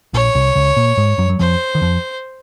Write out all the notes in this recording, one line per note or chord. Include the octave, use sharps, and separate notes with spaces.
A#1 A#2 C#5
C2 C3
C#2 C#3
A#2 A#3
G#2 G#3
F#2 F#3
F#3
F2 F3 C5
D#3
F2 F3